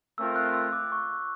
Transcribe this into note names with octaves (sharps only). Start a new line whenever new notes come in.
A3 C4 F4 A#4 E6
F#6
E6
D6
C#6